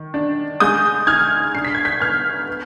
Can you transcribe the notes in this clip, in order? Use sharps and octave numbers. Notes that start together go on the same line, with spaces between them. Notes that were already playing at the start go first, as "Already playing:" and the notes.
Already playing: D#3
D4
G#3 D#6 G6
D#4 F6 G#6
D4 C7
B6
G#6
G6 B6
B3 F6 G#6
B3